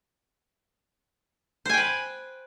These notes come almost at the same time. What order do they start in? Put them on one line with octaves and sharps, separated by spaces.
C5 G#5 G5 B4